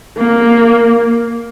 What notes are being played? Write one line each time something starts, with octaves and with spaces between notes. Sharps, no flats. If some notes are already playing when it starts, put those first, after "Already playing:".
A#3